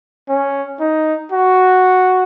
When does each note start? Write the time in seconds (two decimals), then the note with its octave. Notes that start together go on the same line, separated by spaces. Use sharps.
0.29 C#4
0.80 D#4
1.32 F#4